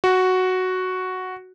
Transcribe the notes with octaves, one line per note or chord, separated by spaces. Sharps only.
F#4